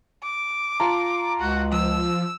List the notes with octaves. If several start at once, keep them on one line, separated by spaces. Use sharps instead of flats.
D6
F4 A5 A#5
C#2 F#4
F3 E6